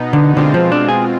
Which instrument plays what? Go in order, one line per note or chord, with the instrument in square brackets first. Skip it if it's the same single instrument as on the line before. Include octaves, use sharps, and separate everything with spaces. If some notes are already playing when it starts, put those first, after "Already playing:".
Already playing: [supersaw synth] B2 B3 D#4
[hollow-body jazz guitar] D3
[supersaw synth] B2 G#3 C4 F4 [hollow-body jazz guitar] D3
[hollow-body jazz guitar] F3
D4
G#4